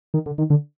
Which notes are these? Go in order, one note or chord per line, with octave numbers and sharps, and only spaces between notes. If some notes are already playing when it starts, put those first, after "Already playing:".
D#3
D3
D#3
D3